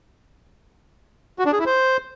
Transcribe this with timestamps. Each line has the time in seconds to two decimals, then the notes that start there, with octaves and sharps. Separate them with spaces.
1.39 F#4
1.46 D4
1.53 G#4
1.59 E4
1.66 C5